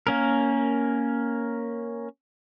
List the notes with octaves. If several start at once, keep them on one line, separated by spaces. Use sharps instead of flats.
A#3 C#4 A#4